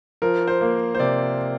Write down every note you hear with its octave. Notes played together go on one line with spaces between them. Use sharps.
F3 A#4
C5
A#3
C5
C3 D5